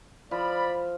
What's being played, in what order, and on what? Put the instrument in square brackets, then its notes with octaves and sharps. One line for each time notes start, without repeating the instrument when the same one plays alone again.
[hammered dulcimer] F3 [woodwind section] D5 B5